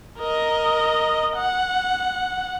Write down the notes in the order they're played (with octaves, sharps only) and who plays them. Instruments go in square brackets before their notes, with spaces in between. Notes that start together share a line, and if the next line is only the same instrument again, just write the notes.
[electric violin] A#4 D#5
F#5